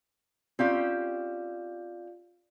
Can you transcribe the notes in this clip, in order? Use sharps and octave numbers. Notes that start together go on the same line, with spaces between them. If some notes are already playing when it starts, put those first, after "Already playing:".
C4 C#4 F4 G4 D5 F5